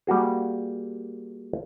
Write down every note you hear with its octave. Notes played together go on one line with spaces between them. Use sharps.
G3 A#3 F#4 G#4